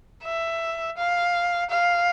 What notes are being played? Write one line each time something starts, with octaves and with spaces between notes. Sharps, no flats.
E5
F5
F5